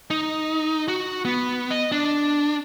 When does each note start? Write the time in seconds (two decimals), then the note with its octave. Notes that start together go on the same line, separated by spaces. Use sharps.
0.10 D#4
0.88 F#4
1.25 B3
1.71 D#5
1.92 D4